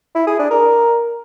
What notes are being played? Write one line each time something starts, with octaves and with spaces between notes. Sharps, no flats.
E4
G#4
D4
A#4